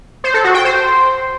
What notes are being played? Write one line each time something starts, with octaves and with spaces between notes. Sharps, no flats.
C5
A4
F#4
G5
C5